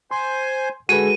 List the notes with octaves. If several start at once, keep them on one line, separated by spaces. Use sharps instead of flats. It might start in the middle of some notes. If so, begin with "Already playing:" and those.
C5 G#5 C6
D3 G#3 F#4 G#4 A4 B4 D#7